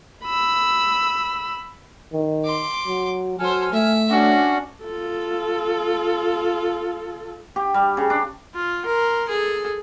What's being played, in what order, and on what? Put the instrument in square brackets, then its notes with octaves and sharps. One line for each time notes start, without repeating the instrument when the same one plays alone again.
[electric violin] B5 E6
[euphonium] D#3
[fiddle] C6 D6
[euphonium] F#3
[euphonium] F#3 [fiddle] A4 C5 [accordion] G#5 F6
[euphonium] A3 [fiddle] E5
[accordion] C#4 D4 [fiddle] F#4
[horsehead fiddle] F4 A4
[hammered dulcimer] G4
G3
C#3
D4
[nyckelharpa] F4
A#4 C6
G#4 A4